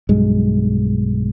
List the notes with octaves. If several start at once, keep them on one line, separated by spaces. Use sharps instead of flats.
B1 G2 G#3